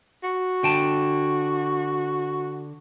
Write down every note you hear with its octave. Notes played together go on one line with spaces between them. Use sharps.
F#4
D3 G5 A5